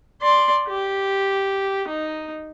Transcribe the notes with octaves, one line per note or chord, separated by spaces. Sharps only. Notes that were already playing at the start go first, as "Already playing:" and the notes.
D5 C6
G4
D#4